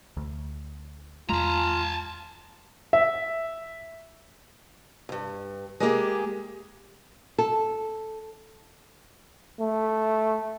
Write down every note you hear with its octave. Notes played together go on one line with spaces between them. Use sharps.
D2
E2 G#3 F4 A5 A#5
E5
D2 G2
G#3 A#3 G4 G#4
A4
A3